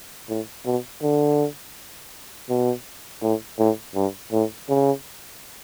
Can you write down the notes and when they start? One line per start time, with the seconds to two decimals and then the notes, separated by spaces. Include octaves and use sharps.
0.29 A2
0.66 B2
1.02 D3
2.49 B2
3.22 A2
3.59 A2
3.95 G2
4.32 A2
4.69 C#3